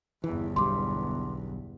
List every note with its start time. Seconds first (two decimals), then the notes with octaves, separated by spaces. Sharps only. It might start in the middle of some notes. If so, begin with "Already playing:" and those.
0.24 G1 E2 E3
0.56 B1 G2 G3 C6 D6